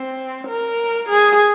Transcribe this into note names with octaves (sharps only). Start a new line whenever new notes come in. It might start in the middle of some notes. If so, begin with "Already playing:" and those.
Already playing: C4
A#4
G#4